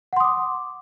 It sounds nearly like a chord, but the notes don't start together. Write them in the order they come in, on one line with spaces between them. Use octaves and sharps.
F#5 C6 D#6 D6